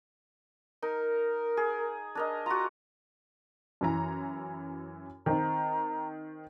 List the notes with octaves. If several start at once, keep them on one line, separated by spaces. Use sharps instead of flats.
D#4 A#4
G#4
D4 A#4 D#5
F4 F#4 A#5
F#2 E3 A#5
D#3 C4 D#4 A#5